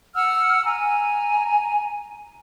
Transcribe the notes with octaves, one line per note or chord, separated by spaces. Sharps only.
F#5 E6 F6
G#5 A#5